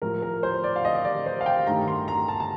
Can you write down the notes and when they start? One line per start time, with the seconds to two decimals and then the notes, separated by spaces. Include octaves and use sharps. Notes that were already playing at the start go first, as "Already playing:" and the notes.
0.02 A2 F3 A3 A#4
0.22 A#4
0.43 C5
0.64 D5
0.76 F5
0.85 D#5
1.05 D5
1.26 C5
1.41 F5
1.46 G5
1.67 G2 D#3 A3 A#5
1.88 C6
2.08 A#5
2.28 A5
2.40 A5